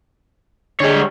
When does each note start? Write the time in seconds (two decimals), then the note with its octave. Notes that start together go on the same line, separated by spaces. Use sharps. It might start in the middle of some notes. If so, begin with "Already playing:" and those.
0.80 D3 G3 G#3 C#5